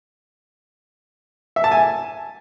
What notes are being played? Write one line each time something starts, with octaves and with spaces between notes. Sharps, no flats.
E5
A5
G#5